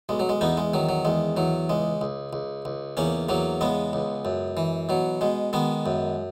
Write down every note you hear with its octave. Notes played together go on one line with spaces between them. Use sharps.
B1 G#3
F#3
G#3
E2 B3 D#4
G#3
D#3 F#3
F#3
E2 G#3
E2 F#3
C#2 G#3
C#2
C#2
C#2
E2 A#3 C#4
E2 F#3 A#3
C#3 G#3 B3
C#2
F#2
E3
B2 F#3
B2 G#3
D#3 G#3 B3
F#2